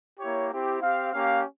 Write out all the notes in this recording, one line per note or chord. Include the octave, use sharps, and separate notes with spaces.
A#3 E4 G4 C#5
C4 E4 G4
C4 G4 F5
A#3 C#4 G4 F5